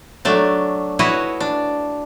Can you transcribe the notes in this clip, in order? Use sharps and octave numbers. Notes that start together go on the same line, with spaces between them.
F#3 A3 D4
E4 F#4 B4 C#5 D#5
D4